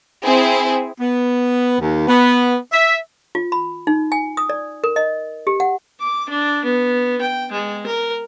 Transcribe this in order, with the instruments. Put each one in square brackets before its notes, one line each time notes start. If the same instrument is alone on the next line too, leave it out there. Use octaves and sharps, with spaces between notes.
[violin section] C4 E4 G#4
[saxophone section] B3
D#2
B3
E5
[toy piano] F4
B5
D#4
G#5
D#6
D5
A#4
D#5
G4
F#5
[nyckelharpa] D6
D4
B3
G5
G#3
A#4